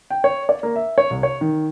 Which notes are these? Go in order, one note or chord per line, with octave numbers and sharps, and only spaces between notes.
G5
C#5
D5
A#3
E5
C#5
C2
C#5
D#3